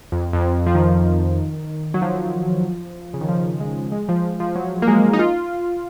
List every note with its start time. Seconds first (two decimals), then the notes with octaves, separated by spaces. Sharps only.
0.12 F2
0.33 F2
0.66 F3
0.75 D#3
1.94 F#3
2.02 F3
3.14 C#3
3.21 D#3
3.29 F3
3.60 G#3
3.92 G#3
4.09 F3
4.40 F3
4.55 F#3
4.82 A#3
4.88 G#3
5.13 D#4
5.19 F4